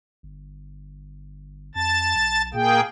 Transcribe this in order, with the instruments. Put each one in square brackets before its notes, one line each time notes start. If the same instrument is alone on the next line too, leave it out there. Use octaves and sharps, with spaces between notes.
[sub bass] G1
[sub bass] F2 [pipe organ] A5 A6
[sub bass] B1
[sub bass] A#2 [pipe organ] A#3 G#4 G5